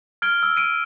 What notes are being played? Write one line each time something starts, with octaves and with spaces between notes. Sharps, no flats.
F6 G#6 D7 G7
E6
D7 D#7